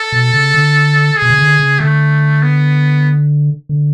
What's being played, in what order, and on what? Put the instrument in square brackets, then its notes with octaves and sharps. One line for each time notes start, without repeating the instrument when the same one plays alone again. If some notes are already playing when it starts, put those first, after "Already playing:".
Already playing: [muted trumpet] A4
[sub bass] B2
C#3
D3
[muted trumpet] G#4
[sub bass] B2
C#3
D3
C#3
[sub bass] D3 [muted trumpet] A3
[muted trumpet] B3
[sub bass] D3